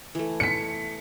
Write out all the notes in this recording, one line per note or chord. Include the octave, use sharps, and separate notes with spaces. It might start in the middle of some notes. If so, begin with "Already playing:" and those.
E3 A3
B6 C#7